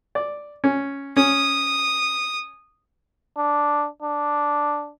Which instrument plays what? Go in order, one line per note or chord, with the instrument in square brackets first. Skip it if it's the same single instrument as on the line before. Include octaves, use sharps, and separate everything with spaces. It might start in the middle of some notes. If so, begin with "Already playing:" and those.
[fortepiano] D5
C#4
[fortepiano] C#4 [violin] D#6
[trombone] D4
D4